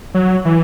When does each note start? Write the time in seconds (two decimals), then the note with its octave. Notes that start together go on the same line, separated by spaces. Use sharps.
0.14 F#3
0.45 E3